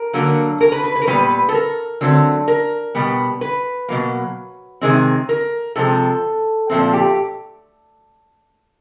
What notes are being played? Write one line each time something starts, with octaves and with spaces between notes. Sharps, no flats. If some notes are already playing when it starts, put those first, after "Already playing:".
Already playing: A#4
D3 F#3 A#3
A#4
B4
B4
B4
A#4
A#2 G3 B3 B4
A4
A#4
D3 F#3 A3 C4
A#4
B2 G3 B3
B4
B2 F#3 A#3
C3 D#3 G#3 C4
A#4
C3 F3 G#3 C4 A4
A#2 F3 A3 C4
G4